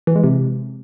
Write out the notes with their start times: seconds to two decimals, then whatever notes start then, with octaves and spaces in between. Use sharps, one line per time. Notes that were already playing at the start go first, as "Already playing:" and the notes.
0.07 E3
0.15 G#3
0.24 C3